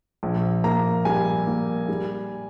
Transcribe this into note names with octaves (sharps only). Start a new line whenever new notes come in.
A#1
A#3 A#5
G3 G#5
A#3
G3